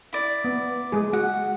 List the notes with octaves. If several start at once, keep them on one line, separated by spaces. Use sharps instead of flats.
E4 D5
B3
G#3 G#4
F#4 F#5